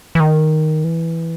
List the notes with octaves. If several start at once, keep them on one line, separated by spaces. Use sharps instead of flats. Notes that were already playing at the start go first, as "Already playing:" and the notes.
E3
D#3
E3